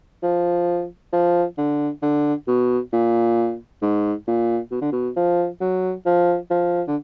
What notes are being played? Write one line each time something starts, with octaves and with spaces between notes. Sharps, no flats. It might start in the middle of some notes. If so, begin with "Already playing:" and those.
F3
F3
D3
D3
B2
A#2
G#2
A#2
B2
D3
B2
F3
F#3
F3
F3
D3